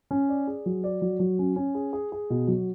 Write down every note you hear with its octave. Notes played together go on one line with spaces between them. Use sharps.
C#4
D5
G#4
F#3
D5
F#3
F#3
C#4
C#4
G#4
G#4
G#4
B2
F#3